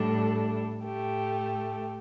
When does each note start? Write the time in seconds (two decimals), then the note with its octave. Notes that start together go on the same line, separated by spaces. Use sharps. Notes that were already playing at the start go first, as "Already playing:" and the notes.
Already playing: A2 G3 D4 A4
0.84 A2 A3 G4